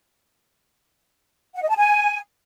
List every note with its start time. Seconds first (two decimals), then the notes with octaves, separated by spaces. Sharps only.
1.55 F#5
1.62 D#5
1.70 A5
1.77 G#5